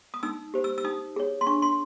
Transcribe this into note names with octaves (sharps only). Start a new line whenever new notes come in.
D#6
D#4 E6
G4 C5
E6
E6
D#4 D#6
G#4 C#5
C6
D4 C#6
C6